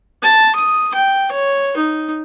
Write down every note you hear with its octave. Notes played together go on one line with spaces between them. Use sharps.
A5
D#6
G5
C#5
D#4